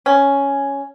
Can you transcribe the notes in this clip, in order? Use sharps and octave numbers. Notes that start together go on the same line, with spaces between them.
C#4